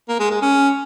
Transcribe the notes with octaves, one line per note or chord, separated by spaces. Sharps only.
A#3
G#3
G#3
C#4